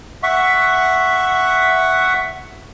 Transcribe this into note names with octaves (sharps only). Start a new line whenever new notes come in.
E5 F#5 C#6